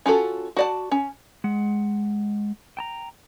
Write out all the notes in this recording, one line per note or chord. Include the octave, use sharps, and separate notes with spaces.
C#4 F4 F#4 A4
F#4 D5 A5
C#4
G#3 F#5
G5 A5 A#5